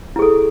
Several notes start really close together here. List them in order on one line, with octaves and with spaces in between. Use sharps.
E4 G#4 A4